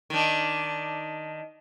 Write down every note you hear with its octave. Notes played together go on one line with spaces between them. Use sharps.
D#3 D4